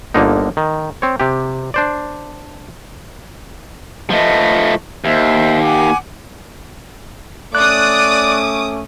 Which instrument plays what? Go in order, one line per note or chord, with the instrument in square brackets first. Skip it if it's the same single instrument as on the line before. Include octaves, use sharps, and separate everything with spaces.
[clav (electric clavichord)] G1 D3 A#3 D#4
D#3
C4 C#5
C3 G4
D4 C5 D5
[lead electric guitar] F3 A3 [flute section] B4 D#5
[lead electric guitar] D#2 [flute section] C5 D#5 E5
[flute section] F#5 G#5 D6
[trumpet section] A3 C#4 [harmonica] D5 [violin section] D6 D#6 [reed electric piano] F#6